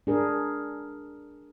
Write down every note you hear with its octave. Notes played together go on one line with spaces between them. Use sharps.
D4 G#4 A#4